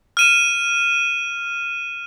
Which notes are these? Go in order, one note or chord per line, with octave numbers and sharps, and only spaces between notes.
F6 D#7 E7